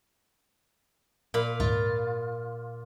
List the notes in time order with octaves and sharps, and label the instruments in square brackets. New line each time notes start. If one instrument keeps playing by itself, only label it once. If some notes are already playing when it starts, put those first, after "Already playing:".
[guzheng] A#2 F5 B5
[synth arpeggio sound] D2 G#2 [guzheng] F4